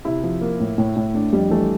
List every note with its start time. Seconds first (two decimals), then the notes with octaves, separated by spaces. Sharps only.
0.05 C3 E4
0.24 F3
0.41 A#3
0.60 A2
0.78 A2
0.97 A2
1.14 A3 D4
1.33 F2 G3
1.51 E3 A3